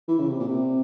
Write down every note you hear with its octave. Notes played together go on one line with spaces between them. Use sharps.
E3
C#3
C3
A#2
C3